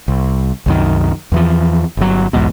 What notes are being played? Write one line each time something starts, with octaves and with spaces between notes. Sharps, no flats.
C2
C2 F#2 D#3
E2 E3 F3
G1 F#3
B1 E2 G#2 B2